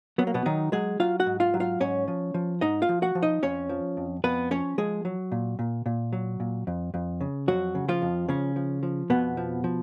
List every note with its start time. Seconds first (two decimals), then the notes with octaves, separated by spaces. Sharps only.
0.18 F#3 B3
0.27 A#3
0.34 B2 B3
0.46 D#3 F#3 D#4
0.72 F#3 G#3 G#4
1.00 F#3 F4 F5
1.20 F#4 F#5
1.26 G#2
1.40 F4 F5
1.54 F#3
1.60 F4 F5
1.80 G#2 C#4 C#5
2.08 F3
2.34 F3
2.61 G#2 D#4 D#5
2.82 F4 F5
2.89 F3
3.02 F#4 F#5
3.15 F3
3.22 D#4 D#5
3.43 F2 C#4 C#5
3.69 F3
3.97 F2
4.24 F2 B3 B4
4.51 F3 C#4 C#5
4.78 F3 G#3 G#4
5.05 F#3
5.32 A#2
5.59 A#2
5.86 A#2
6.13 F#3
6.40 A#2
6.67 F2
6.94 F2
7.21 C#3
7.48 F2 F#3 F#4
7.75 C#3
7.89 F3 F4
8.02 F2
8.28 C#3 F3 C#4
8.56 F3
8.83 F3
9.10 F2 B2 B3
9.37 F3
9.64 F3